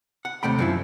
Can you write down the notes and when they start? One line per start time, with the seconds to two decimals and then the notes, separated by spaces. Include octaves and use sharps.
0.25 F#5
0.43 D#2 C3 A3 G5 B5
0.59 F#2 F3 E4